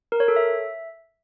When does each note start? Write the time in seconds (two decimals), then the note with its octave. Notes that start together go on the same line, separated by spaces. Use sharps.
0.12 A#4
0.20 C#5
0.28 A4
0.36 E5